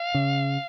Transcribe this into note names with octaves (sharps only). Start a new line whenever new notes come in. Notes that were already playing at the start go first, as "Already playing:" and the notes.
Already playing: F5
C#3